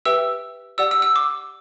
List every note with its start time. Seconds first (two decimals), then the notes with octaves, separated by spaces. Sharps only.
0.05 G4 B4 E5 G5 E6
0.78 G4 D5 F#5 E6
0.91 E6
1.02 E6
1.16 D6